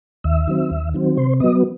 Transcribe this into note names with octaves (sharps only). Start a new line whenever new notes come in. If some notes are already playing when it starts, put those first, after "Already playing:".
D#2 E5
D#3 F#3 C4
D#2
D#3 F#3 C4
C3 C5
F#3 B3 D#5